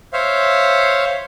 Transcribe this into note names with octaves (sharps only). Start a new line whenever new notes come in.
C5 C#5 E5 F5